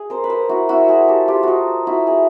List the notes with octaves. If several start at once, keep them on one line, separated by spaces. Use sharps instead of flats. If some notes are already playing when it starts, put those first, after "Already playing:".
Already playing: G#4
A#4 C5
B4
A#4 C5
E4 F#4
E4 F#4
F#4 G#4
G4 A4
F4 G4
D#4 F4 F#4
E4 F#4
G#4